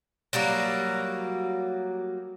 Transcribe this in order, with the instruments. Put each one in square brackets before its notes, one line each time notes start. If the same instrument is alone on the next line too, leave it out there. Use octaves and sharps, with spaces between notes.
[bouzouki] F#3 G3 A#3 F#4